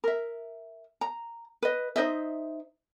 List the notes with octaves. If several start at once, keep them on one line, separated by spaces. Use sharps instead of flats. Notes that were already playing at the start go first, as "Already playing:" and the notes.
A#4 E5
A#5
B4 D#5
D#4 C5 D#5 E5